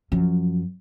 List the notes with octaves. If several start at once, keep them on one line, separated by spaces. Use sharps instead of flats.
F#2 F3